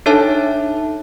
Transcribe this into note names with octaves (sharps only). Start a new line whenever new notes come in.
D4 D#4 A4 C#5 E5 A5